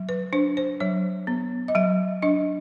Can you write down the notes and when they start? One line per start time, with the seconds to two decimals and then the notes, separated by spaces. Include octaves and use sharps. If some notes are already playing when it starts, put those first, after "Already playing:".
Already playing: F#3
0.09 B4
0.33 D4 C5
0.57 C5
0.80 F#3 C#5
1.27 B3
1.68 D#5
1.75 F#3 E5
2.22 D4 D#5